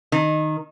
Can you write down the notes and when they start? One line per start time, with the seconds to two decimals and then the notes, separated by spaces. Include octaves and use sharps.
0.12 D#3